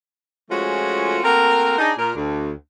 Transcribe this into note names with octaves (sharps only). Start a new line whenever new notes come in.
F3 G#3 A3 C#4 F4 F#4
A3 A#3 C4 F#4 A#4
D4 D#4 G#4
A#2 A#4
D2